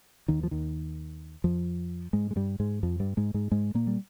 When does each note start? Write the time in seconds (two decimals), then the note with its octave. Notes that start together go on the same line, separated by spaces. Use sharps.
0.28 D#2 D#3
0.43 F3
0.51 D#2 D#3
1.44 F2 F3
2.13 G#2 G#3
2.31 G#3
2.36 G2 G3
2.60 G#2 G#3
2.83 F2 F3
3.00 G2 G3
3.17 G#2 G#3
3.34 G#2 G#3
3.52 G#2 G#3
3.75 A#2 A#3
3.87 G3